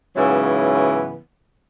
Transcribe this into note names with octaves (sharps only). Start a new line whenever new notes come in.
G#2 C#3 E3 F#3 B3 E4